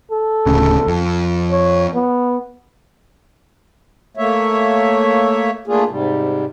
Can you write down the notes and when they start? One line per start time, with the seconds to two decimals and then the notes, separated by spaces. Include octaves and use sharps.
0.12 A4
0.46 D1 D2 C#3
0.88 F2
1.51 C#5
1.94 B3
4.17 A3 A#3 C#5 E5
5.67 A3 A#3 D4 F4 G#4
5.89 G#2 C3 G3